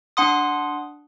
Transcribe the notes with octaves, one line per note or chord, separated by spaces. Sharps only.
D4 F#5 C6 D#6